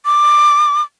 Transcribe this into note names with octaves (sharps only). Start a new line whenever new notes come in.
D6